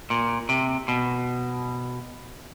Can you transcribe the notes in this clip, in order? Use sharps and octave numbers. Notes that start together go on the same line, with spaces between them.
A#2
C3
B2